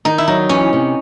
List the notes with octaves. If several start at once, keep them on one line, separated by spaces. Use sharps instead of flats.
D#3 D#4
E4
F#3 D#4
E3 C#4
C3